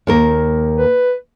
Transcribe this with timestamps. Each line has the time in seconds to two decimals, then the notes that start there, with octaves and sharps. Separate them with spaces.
0.07 D#2 A#3 A#4
0.78 B4